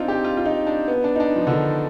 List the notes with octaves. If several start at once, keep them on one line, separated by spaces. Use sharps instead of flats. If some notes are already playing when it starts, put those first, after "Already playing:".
Already playing: C4 D4 D#4 F4
G4
F4
F4
D#4
D4
B3
D4
D#4
D4
F3
D3
D#3